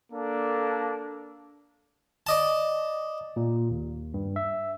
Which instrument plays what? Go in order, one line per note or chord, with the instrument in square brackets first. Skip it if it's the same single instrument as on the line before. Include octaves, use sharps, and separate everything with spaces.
[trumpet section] A#3 D4 A4
[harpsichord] D5 D#5 A5
[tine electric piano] A#2
D#2
G2
E5